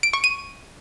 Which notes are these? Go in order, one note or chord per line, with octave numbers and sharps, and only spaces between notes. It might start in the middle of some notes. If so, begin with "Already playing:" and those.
D7
C#6
D#7